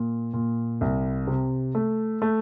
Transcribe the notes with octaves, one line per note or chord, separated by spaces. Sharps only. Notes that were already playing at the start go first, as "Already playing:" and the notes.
Already playing: A#2
A#2
C2
C3
A3
A3